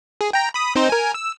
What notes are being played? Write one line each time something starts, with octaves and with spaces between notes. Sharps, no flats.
G#4
G5 A#5
B5 D#6
C4 D#4 C5
A#4 G#5
E6